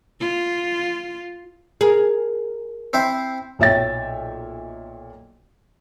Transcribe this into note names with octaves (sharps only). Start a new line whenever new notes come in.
F4
G#4 A#4
C4 E4 C5
B1 A#2 C#5 E5 G5 A6